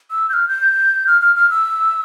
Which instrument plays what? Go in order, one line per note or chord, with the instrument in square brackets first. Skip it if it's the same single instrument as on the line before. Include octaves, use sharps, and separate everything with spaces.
[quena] E6
G6
F6
G6
F6
F6
F6
E6